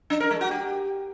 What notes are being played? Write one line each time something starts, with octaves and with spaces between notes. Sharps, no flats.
D4
A#4
G#3
F#4
G4